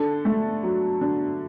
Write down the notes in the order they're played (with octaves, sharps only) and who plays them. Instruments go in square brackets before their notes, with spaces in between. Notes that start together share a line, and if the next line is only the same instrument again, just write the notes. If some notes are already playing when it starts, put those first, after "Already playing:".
Already playing: [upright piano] D3 A4
A3
F#3
D3